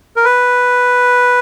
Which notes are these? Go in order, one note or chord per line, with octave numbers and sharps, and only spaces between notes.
A#4
B4